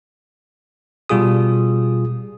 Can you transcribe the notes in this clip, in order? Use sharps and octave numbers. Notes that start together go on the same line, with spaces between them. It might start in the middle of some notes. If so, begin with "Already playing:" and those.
B2 G3 F4 G#4 D#6